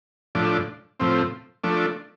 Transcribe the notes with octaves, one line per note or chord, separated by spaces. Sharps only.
A2 F3 D4
A2 F3 C4
F3 A3 D4